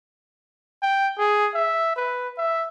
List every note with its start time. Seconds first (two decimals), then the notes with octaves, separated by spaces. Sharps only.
0.83 G5
1.18 G#4
1.55 E5
1.96 B4
2.38 E5